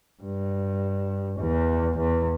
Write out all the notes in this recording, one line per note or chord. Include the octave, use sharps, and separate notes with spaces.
G2
E2
E2